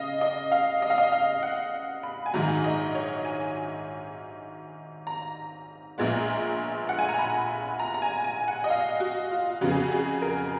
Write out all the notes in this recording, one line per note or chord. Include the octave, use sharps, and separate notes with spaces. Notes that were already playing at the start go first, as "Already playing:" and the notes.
Already playing: C#3 D#5 F5
D#5
F5
D#5
F5
D#5
F5
F#5
B5
G#5
A#1 G#2 D#3 F#3 A#5
D#5
C#5
G#5
A#5
A#1 A#2 G#3 B3
F#5
G#5
A#5
B5
B5
A#5
A#5
G#5
G#5
F#5
D#5
F5
F#4
F4
F4
F2 C#3 F#3 B3 F#4
G#4
F#4
G#4
A#4